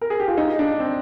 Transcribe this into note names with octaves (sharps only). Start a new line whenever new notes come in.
A#4
G#4
G4
F4
D#4
D4
C4